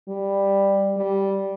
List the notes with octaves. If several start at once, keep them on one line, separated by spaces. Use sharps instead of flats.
G3
G3